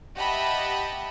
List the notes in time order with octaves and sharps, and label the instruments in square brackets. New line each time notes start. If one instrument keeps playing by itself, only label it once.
[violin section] G4 D#5 E5 F#5 A5 B5